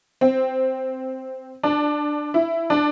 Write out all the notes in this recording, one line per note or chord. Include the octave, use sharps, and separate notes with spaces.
C4
D4
E4
D4